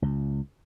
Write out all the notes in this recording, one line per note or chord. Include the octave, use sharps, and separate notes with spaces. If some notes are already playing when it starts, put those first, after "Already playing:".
C#2